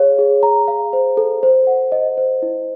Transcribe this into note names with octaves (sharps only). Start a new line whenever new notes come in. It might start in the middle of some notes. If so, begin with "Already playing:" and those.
Already playing: G#4 C#5 F5
G#4
A#5
F5
C5
A4
C5
F#5
D#5
C5
E4